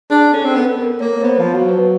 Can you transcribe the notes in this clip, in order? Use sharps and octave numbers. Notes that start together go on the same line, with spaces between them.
D4 G#4
C#4 A4
C4
B3 A4
A#4
A#3 C#5
C#5
B3 C5
F3
F#3
B4